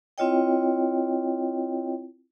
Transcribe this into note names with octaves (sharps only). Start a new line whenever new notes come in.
C4 E4 F4 C#5 D#5 G5